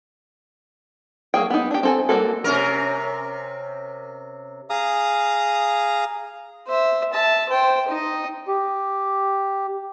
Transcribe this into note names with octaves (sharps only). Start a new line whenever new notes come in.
F#3 A#3 G#4 G5
B3 D#4
D4 G4
C4 A4 G#5
G3 A#3 E4 F#4 A4
C3 C#4 A#4
G#4 F5 A#5 D#6
C5 E5
E5 A5
C5 G5
D#4 D#5
G4